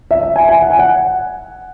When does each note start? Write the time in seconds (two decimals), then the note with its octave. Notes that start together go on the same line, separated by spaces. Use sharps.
0.11 E5
0.23 E5
0.36 G#5
0.49 G#5
0.62 F#5
0.70 G#5
0.79 F#5